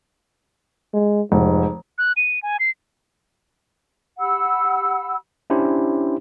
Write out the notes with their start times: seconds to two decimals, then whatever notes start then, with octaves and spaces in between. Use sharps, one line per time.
0.93 G#3
1.32 F1 G#2
1.98 F#6
2.17 D#7
2.43 G#5
2.60 C7
4.19 G4 F#5 B5 E6
5.50 C#4 D4 E4 G4 C5